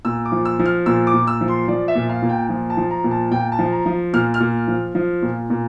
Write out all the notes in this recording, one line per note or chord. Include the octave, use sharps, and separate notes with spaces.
A#2 E6
D6
F3
E6
F3
F6
A#2 E6
D6
A#2
E6
F3
C6
F3 D5
E5
A#2
F5
A#2
G5
F3
A5
F3
A#5
A#2
A5
A#2 G5
A5
F3
A#5
F3
A#2 F6
F6
A#2
F3
F3
A#2
A#2